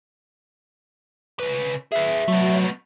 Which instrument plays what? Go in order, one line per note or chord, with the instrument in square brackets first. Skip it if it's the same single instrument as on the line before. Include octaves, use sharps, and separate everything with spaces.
[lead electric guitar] C#3 B4
[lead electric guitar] G#4 B4 [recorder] E5
[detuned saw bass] F#3 [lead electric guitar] A3 B3